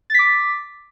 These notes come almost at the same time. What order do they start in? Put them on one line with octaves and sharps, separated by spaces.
A6 B6 D6